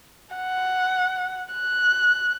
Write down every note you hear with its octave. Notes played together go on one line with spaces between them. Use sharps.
F#5
F#6